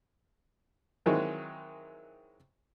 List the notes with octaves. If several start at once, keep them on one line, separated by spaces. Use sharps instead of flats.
D#3 E3 F#3 G#3 C4